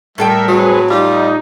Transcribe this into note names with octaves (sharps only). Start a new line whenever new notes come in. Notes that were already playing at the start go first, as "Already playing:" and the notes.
A2 G3 A4 A#4 E5 G5
F#3 C4 G#4 B4
G3 D#4 F4